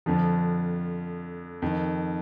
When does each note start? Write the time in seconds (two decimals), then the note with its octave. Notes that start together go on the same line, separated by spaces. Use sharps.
0.06 F2 D3 F3
1.62 F2 D#3